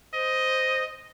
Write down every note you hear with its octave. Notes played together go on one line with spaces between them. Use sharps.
C5 D#5